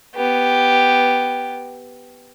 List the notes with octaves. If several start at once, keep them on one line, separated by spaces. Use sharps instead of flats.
B3 G4